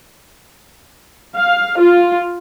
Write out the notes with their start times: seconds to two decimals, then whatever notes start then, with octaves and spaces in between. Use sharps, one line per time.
1.36 F5
1.81 F4